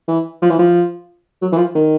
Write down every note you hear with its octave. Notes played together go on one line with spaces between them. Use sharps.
E3
F3
E3
F3
F#3
E3
F3
D#3